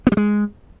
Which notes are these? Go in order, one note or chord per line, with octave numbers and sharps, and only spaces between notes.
B3
G3
G#3